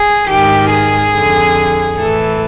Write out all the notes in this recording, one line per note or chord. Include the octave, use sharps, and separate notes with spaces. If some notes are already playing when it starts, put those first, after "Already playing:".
Already playing: G#4
G#2 D#3 G4
G#4
F2 D3
A2 E3 A4